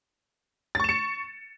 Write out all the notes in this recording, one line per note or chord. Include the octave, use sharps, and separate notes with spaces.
C#6 A6 C#7 E7